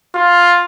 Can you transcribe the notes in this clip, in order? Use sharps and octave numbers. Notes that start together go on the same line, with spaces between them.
F4